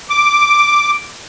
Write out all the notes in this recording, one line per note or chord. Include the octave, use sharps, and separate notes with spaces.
D6